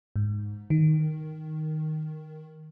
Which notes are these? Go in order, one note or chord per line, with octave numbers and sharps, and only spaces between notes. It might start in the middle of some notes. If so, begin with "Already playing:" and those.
G#2
D#3